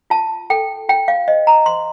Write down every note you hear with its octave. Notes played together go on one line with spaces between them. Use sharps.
F4 A5
A4 G5
F4 G5
F5
C5 D#5
A#5
C5 C6